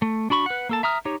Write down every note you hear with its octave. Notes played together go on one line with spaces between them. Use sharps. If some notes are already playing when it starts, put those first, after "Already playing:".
A3
D4 F#4 B5 C#6
B4 F#5
A#3 A4 A5
E5 A#5 D#6 F6
D#4 G4 C#5